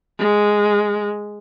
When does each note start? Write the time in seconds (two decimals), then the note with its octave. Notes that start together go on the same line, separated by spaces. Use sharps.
0.19 G#3